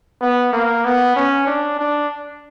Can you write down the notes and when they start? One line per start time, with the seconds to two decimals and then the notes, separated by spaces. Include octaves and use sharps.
0.21 B3
0.53 A#3
0.85 B3
1.16 C#4
1.47 D4
1.79 D4